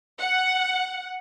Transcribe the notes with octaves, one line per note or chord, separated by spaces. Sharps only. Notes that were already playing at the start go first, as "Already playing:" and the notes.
F#5